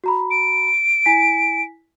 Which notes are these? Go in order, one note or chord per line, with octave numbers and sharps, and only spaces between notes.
F#4 A#5 B5
D7
E4 G#5 B6